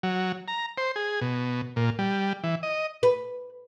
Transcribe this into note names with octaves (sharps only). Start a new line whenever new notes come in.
F#3
A#5
C5
G#4
B2
A#2
G3
E3
D#5
B4